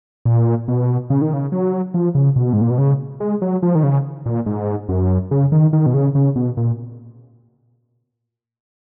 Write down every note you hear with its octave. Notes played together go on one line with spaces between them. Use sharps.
A#2
B2
C#3
D#3
C#3
F#3
F3
C#3
B2
G#2
A#2
B2
C#3
G#3
F#3
F3
D#3
C#3
A#2
G#2
F#2
C#3
D#3
D#3
B2
C#3
C#3
B2
A#2